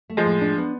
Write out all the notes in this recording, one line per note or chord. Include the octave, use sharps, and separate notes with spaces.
A3
F3 G#3
A2
D4
B3